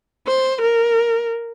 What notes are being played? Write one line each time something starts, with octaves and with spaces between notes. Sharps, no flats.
C5
A#4